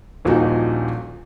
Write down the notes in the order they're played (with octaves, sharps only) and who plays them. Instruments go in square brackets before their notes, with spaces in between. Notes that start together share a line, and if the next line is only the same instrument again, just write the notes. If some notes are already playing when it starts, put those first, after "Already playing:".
[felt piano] D#1 A#1 A#2 D#4 F#4